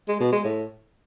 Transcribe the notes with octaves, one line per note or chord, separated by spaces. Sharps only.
G#3
B2
G#3
A2